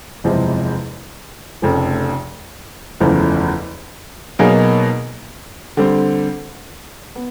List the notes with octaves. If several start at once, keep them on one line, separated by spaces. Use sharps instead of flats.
F#1 E2 C3 F3 G#3
F1 F2 C#3 F3 A3
F#1 E2 C#3 F3 A3
B2 F#3 A#3 D#4 G#4
D3 G3 C4
B3